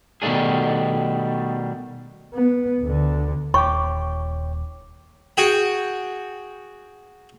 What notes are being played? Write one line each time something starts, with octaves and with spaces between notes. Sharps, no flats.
B2 D#3 G3 A3 D4 G#4
B3
D2 D3
D#1 D#2 C#5 G5 C#6 D6
F#4 G#4 G5